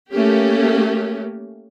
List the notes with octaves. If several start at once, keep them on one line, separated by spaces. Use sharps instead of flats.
A3 A#3 C#4 G4